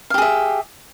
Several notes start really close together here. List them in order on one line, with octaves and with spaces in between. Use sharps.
F5 G4 G#4 E5